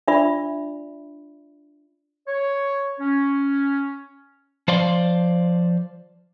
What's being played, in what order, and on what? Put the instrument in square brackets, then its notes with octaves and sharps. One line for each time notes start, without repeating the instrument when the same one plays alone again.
[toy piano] D4 F4 D5 E5 B5
[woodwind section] C#5
C#4
[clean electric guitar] F3 C5 D5 F5 C6